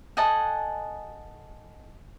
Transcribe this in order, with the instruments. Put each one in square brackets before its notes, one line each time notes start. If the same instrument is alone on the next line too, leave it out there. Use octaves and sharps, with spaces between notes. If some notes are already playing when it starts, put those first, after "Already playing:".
[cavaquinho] A4 D#5 F#5 G#5